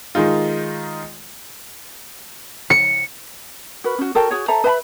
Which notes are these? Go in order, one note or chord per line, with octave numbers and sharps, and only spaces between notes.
D#3 G#3 D#4 F4
C#7
F#4 A#4 B4
C#4 F#4
F#4 A4 A#4 G5
F#4 G#4 C#5
A4 C5 E5 A#5
B4 E5 A5 B5